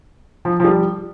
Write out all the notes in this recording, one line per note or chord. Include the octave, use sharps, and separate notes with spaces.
F3
F3
G3